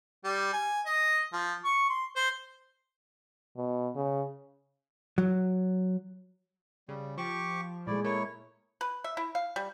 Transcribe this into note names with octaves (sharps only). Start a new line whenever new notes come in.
G3
G#5
D#5
F3
C#6
C6
C5
B2
C#3
F#3
C#3 G3
F3 G4 C#6 D6
A#2 G#3 A3 E4 G#4 D5
A3 E4 A#4 C#5
B4
E5
E4
F5
G3